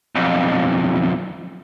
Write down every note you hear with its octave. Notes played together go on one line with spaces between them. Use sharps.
B1 F2